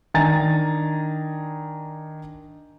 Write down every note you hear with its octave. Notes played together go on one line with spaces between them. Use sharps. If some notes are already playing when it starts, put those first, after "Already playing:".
D#3 D4 G#5 A#5 A6